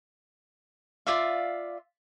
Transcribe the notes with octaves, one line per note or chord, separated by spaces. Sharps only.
F4 D5 E5 F5